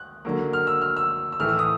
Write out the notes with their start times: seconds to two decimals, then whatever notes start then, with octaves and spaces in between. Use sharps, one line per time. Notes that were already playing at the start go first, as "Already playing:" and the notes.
Already playing: F#6
0.25 D3 F#3 A#3
0.53 F6
0.67 E6
0.82 F6
0.96 E6
1.32 E6
1.40 A2 E3 A3 F6
1.49 E6
1.59 D#6